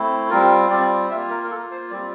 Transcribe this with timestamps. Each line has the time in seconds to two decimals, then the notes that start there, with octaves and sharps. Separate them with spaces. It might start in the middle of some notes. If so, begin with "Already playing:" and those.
Already playing: A3 C4 E4
0.29 G3 C4 F4 A#4
0.70 G3 C4 F4 D5
1.10 A#3 F4 E5
1.30 A#4
1.44 A#4
1.50 A#3 F4 A4
1.71 C5
1.91 G3 C4 F4 D5